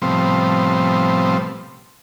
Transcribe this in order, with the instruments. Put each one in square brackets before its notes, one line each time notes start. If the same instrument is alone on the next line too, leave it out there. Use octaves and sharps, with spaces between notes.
[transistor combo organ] A2 C3 F3 G3 B3 C4